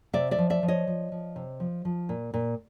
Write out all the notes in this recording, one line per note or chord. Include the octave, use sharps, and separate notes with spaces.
C3 D5 E5
D5 E5
F3
D5 E5
F3
C#5 D#5
F3
F3
C3
F3
F3
A#2
A#2